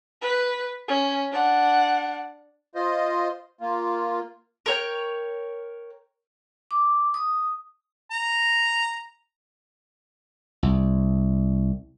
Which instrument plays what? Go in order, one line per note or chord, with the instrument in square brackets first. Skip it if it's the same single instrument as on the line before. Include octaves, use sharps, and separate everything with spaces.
[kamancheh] B4
C#4
D4 F#5
[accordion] F4 C5 D#5
A#3 F4
[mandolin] A#4 C#5 G5
[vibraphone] D6
D#6
[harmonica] A#5
[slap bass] C2